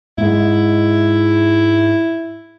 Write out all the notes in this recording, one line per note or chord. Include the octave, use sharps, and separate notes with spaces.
G#2 G#3 E4